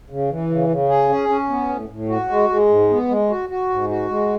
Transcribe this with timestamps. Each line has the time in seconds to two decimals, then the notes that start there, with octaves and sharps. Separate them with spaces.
0.10 C#3
0.30 E3
0.50 C#3
0.69 C#3
0.89 G#4
1.09 C#4
1.29 C#4
1.50 B3
1.69 A2
1.89 A2
2.09 F#4
2.29 G#3
2.50 G#3
2.69 G#2
2.90 B3
3.09 G#3
3.30 F#4
3.49 F#4
3.70 G#2
3.89 F#4
4.09 G#3